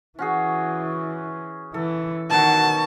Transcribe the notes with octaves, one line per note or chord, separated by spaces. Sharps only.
E3 C#4 F#4 G#4
E3 A4
B2 D#3 F#3 F#4 A5